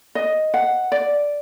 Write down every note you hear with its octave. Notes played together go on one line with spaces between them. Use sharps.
D#5
F#5
D5